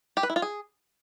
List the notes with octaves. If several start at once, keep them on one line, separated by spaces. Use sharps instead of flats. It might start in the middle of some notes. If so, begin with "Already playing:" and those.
G4
B4
E4
F4
G#4